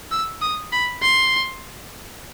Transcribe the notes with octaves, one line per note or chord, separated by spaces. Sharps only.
E6
D#6
B5
C6